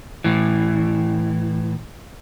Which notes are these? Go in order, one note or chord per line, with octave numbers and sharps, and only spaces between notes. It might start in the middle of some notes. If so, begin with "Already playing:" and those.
A2 E3